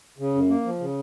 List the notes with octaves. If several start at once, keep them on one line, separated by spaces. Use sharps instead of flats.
C#3
F#2
A#3
F3
C#3